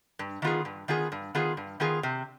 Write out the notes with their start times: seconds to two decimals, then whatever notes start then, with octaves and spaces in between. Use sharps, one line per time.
0.19 G2
0.42 D#3 B3 F4 G#4
0.65 G2
0.88 D#3 B3 F4 G#4
1.12 G2
1.35 D#3 B3 F4 G#4
1.57 G2
1.80 D#3 B3 F4 G#4
2.03 C3